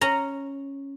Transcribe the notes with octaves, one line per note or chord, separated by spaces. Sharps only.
C#4 A#5